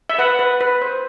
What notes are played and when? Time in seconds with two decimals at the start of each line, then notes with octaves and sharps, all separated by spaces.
0.09 E5
0.19 B4 F#5
0.39 B4
0.61 B4
0.82 C5